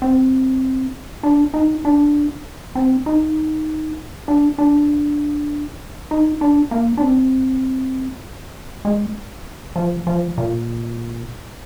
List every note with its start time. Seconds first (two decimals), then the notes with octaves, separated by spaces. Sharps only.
0.02 C4
1.23 D4
1.54 D#4
1.85 D4
2.75 C4
3.06 D#4
4.28 D4
4.58 D4
6.11 D#4
6.41 D4
6.71 A#3
6.97 D4
7.02 C4
8.85 G#3
9.76 F3
10.07 F3
10.38 A#2